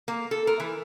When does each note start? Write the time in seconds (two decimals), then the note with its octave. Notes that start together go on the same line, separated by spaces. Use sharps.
0.08 A#3
0.31 A4
0.47 A#4
0.60 E3